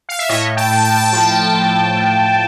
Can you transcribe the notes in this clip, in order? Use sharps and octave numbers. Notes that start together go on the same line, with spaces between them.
F5
E5
A2 C#5 D#5
G5 A5
A2
G5 A5
F3
A2
A2